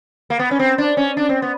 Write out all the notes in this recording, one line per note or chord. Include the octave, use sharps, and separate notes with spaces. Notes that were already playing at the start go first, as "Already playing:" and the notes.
A#3
B3
C#4
C4
D4
C#4
D4
C4
B3